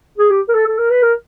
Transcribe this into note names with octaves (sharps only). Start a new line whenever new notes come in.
G#4
G4
A#4
A4
A4
A#4
B4
A#4